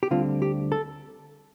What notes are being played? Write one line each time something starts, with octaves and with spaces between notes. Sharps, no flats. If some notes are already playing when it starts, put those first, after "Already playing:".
G4
D2 D3 G3 C4 F4
G4
A4